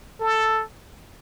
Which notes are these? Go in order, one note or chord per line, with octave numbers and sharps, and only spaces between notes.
A4